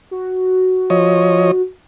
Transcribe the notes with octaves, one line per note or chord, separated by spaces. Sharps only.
F#4
F3 C#5 D#5